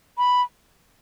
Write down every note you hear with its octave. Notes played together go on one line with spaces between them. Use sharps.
B5